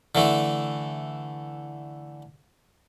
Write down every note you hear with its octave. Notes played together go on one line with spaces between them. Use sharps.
D3 E3 A3